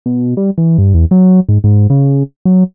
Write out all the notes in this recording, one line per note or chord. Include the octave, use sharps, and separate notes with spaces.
B2
G3
E3
G2
E2
F#3
G#2
G#2
C#3
F#3